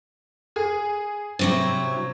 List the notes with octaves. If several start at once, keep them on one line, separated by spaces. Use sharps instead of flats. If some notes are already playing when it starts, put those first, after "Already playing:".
G#4
C3 F#3 C4 E4